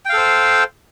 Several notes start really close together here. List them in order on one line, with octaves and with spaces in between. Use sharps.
G5 F5 A4 C5